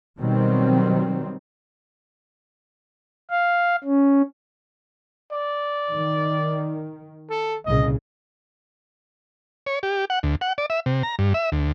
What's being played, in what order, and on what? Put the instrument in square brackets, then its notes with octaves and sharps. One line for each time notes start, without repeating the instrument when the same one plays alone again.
[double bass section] B2 D#3 F#3 G3 C4
[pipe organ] F5
C#4
[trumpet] D5
[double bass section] D#3
[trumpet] A4
[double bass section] C2 A#2 C#3 [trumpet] D#5
[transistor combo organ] C#5
G4
F#5
D2
F#5
D5
E5
C3
A#5
G2
E5
D2